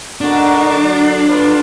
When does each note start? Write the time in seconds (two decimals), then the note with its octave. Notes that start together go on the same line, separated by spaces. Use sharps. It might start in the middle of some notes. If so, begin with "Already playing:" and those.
0.21 D3 G#3 D4 D#4 F#4 A#4
0.74 D2 D3 F#3
1.27 D3 F3 B3 F4 B4